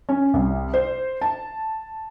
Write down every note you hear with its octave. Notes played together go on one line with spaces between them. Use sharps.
C#4
C2
C5
A5